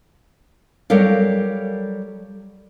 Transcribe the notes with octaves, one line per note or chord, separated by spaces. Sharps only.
F#3 G3 A4 A#4 F5